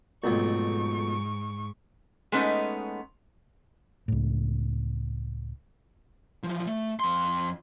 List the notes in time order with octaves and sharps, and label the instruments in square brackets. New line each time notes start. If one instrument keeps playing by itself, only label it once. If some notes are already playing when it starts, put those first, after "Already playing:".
[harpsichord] B1 F2 A3 [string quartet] G#2 C#6
[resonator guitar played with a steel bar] G#3 A3 B3 C#4 D#4
[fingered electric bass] C#2 A2
[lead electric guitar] E3 F3
A3
F2 C6